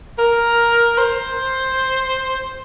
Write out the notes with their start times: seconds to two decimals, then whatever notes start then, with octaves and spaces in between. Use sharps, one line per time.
0.18 A#4
0.98 C5